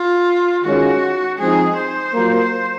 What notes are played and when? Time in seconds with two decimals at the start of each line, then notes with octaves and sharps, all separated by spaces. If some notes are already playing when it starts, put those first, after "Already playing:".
Already playing: F4
0.64 D#3 G#3 C#4 F4 F#4
1.39 F3 G#3 C4 D#4 G#4
1.77 C5
2.13 F#3 A#3 F4 A#4